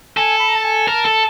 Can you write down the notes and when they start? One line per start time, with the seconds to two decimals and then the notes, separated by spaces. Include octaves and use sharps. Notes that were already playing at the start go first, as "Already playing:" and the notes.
0.17 A4 G#5
0.39 B5
0.48 A#5
0.56 A5
0.64 G#5
0.87 A#4 A5
1.05 A4